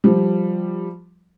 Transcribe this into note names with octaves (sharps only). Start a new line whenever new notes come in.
F3 G3